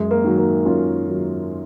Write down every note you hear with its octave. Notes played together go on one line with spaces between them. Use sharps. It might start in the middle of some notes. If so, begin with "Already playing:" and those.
Already playing: F#2 G#3
A#3
D#3 F#3
A#3
F#2 C#4 F4
D#3 F#3